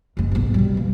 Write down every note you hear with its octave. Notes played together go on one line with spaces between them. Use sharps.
F#1 G#3
B1 G#2
B2 G3
E3 A#3